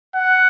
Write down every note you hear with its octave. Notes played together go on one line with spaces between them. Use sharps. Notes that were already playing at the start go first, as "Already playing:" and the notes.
F#5